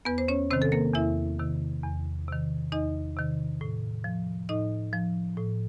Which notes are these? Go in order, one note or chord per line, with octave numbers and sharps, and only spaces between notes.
E2 B3 B4
C5
C#4 C#5
C3 D#3 C4 C5
A4
A#3 A#4
E2 E4 E5
C3 D#3
E2
C3 D#3
E2 D#4 D#5
C3 D#3
A2
F3
A2 D#4 D#5
F3
A2